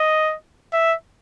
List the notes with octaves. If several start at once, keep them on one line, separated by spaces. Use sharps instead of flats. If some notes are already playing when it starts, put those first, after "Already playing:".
Already playing: D#5
E5